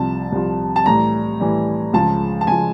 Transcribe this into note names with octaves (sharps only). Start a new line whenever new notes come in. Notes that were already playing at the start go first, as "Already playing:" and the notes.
Already playing: C2 C3 F3 A5
C2 C3 F3
A5
A2 E3 G3 A#5
A2 E3 G3
C#2 C#3 F3 A5
A5
C#2 C#3 F3 G#5